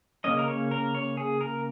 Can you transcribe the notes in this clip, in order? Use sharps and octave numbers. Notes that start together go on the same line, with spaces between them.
C#3 A#3 C#4 D#5
A#4
C#5
A#4
C#5
G#4
A#4